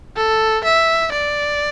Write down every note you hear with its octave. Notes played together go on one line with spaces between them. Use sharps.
A4
E5
D5